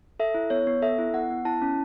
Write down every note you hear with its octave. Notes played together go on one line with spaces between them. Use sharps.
A4 E5
E4
B3 C#5
B3
A4 E5
E4
B3 F#5
B3
E4 A5
C#4